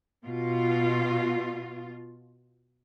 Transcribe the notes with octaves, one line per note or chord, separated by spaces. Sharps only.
B2 F4